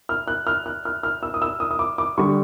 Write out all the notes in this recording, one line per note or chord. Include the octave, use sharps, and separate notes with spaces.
F6
F#6
F6
F#6
F6
F6
E6
D#6
E6
D#6
D#6
D6
D6
D3 G3 C#6